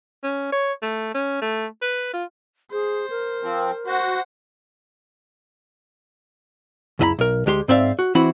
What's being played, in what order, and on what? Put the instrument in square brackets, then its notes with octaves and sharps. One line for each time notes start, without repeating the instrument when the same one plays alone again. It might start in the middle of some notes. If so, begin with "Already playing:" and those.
[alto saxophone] C#4
C#5
A3
C#4
A3
B4
F4
[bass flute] G#4 [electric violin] C5
[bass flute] A#4
[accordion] F3 C4
[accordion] F#4 [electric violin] C5 F#5
[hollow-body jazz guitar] C#2 F#2 E4 D#5 A#5 B5
B1 A#4
D2 G#3 G4 C6
G#2 C4 D5 E5 F5
F#4
E3 C4 E4 F#4 B5